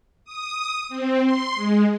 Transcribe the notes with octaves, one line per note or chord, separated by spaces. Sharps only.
D#6
C4
C6
G#3